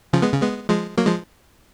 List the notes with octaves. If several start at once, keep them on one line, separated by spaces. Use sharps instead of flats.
C#3 F3
G#3 B3
C#3
G#3 B3
F3 G#3
F#3 A#3
F3 G#3